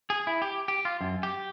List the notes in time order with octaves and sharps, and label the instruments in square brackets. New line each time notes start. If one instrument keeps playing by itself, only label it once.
[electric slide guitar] G#4
E4
G4
G4
F4
F#2
G4